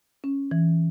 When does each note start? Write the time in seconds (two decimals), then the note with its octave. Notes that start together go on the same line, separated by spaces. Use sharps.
0.24 C#4
0.51 E3